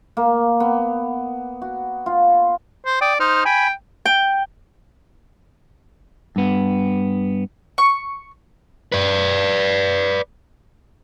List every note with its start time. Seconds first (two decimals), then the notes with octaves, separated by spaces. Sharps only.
0.17 A#3
0.60 B3
1.62 F#4
2.06 F4
2.85 C5
3.01 D5 G5 D#6
3.20 D#4 C5 F6
3.45 G5 G#5 B5
4.05 G5
6.36 G2 B3
7.78 C#6
8.92 B4 D5